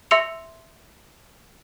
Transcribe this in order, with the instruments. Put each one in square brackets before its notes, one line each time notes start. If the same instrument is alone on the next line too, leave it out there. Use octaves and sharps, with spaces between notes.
[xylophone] E5 C6 E6 C#7 F7